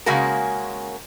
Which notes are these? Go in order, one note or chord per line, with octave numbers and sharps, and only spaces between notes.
C#3 G#3 A#3 C#4 F#4 A#4